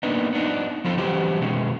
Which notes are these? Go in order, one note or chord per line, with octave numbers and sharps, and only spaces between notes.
A#3 B3 D4 D#4
B3 D4 D#4
F3 F4 A4
E3 F#3 G3 C#4 G4 C5
B2 D#3 G#3 C#4